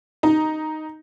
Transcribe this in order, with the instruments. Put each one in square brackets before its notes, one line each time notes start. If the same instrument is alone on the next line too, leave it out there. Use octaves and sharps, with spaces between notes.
[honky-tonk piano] D#4